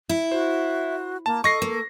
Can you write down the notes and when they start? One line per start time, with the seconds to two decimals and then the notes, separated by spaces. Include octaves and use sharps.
0.09 E4
0.32 F#4 C5
1.26 A#3 A5
1.44 A4 D#5 C#6 A#6 C7
1.62 A#3